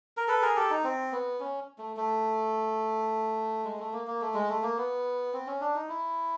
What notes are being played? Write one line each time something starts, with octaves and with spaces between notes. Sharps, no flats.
A#4
A4 B4
G#4 A#4
G4 A4
D#4
C4
B3
C#4
A3
A3
G#3
A3
A#3
A#3
A3
G#3
A3
A#3
B3
C4
C#4
D4
D#4
E4